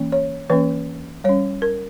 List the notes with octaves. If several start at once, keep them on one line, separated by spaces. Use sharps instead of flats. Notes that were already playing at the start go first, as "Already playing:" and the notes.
Already playing: E3 A#3 C#4
C#5
E3 A#3 C#4 B4
G3 C#4 C#5
A#4